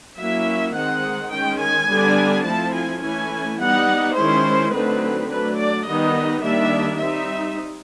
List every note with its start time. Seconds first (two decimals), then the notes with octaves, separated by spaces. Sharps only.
0.18 F#3 A#3 C#4 E4 E5
0.75 D#3 G#3 C4 D#4 F#5
1.31 D#3 G#3 C#4 G5
1.61 G#5
1.88 D3 G3 B3 D4
2.45 F3 A3 C4 E4 A5
2.74 G#5
3.02 E3 A3 C#4 E4 G#5
3.59 G3 B3 D#4 F#5
4.16 D#3 G#3 C#4 E4 C5
4.73 D3 F#3 A3 C4 D#4 B4
5.30 F#3 A3 D4 B4
5.58 D5
5.86 D#3 G3 B3 D#4 D#5
6.43 D#3 G3 A#3 D4 E5
7.00 G3 C4 D#4 E5